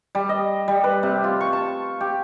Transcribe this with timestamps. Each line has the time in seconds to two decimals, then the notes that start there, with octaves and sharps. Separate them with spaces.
0.15 G3
0.29 D#5
0.68 G3
0.84 B4
1.03 C3
1.24 F4
1.41 C#6
1.53 A5
2.01 G4